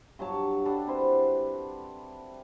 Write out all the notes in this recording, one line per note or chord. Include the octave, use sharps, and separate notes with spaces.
G2 F#3 C#5 A5
G3 D4 A4 F#5
C4 E4 B4 C5